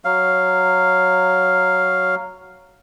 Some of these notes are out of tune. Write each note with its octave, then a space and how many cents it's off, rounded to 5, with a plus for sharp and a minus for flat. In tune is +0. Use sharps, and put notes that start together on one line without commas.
F#3 +0 F5 +0